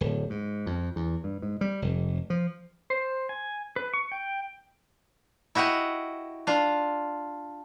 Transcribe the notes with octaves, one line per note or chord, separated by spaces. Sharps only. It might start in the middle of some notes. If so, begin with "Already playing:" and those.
D1
G#2
F2
E2
G2
G#2
G3
F1
F3
C5
G#5
B4
C#6
G5
E4 F#4 G4 D#5 F#5
D4 F4